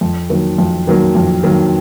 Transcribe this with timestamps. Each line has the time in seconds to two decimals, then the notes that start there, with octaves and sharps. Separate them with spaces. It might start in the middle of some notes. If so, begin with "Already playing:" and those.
0.01 F2
0.29 D#3 F#3 A#3
0.58 F2
0.87 D#3 F#3 A#3
1.15 F2
1.43 D#3 F#3 A#3